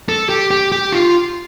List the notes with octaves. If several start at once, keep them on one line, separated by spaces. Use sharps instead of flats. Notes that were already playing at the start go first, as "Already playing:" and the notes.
A4
G4
G4
G4
F4